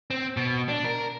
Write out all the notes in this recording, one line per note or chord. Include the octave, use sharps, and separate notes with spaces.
C4
B2
D4
A#4